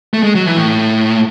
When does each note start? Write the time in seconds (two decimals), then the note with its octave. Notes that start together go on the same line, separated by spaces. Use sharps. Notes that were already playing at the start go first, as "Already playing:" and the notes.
0.14 A3
0.23 G#3
0.35 F#3
0.46 E3
0.57 A2